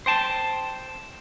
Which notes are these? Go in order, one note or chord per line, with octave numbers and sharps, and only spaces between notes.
C5 G5 A5